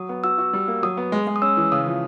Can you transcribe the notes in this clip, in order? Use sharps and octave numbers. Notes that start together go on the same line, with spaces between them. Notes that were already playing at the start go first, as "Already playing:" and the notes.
Already playing: F#3 D#6
B3
F#4 E6
F#4
G3
A#3
F#3 D#6
B3
G#3
G#3
D#6
C#4 E6
E3
C#3 D#6
F3